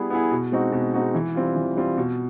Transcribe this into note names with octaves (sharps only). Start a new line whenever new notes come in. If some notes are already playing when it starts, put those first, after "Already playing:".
Already playing: G3 B3 E4 G#4
B3 E4 G#4
B2
G#3 C4 D#4 F#4
B2
G#3 C4 D#4 F#4
E3
G3 C4 F4
E3
G3 C4 F4
B2